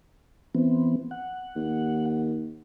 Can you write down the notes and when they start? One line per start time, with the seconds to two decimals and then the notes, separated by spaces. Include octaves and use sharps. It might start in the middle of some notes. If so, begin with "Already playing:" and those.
0.55 E3 B3 C4
1.11 F#5
1.55 D#2